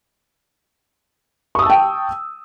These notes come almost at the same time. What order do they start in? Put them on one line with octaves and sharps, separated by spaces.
C#6 D#6 E6 A5 G5